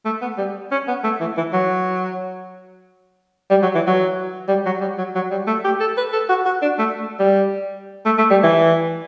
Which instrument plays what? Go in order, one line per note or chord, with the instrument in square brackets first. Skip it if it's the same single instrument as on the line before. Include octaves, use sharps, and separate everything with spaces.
[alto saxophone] A3
B3
G3
C#4
B3
A3
E3
E3
F#3
G3
F#3
E3
F#3
G3
F#3
G3
F#3
F#3
G3
A3
G4
A4
B4
A4
F#4
F#4
D4
A3
G3
A3
A3
G3
E3